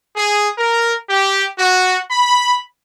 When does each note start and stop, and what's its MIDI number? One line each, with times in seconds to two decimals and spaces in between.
0.16 0.49 68
0.57 0.94 70
1.09 1.46 67
1.59 1.99 66
2.11 2.58 83